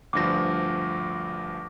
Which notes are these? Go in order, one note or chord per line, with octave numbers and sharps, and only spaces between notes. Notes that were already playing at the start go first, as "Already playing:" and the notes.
D2 G2 F3 D6 A#6